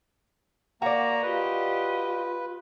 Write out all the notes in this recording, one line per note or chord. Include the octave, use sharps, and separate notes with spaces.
A#3 F#4 D5 A#5
F4 G4 B4 D#5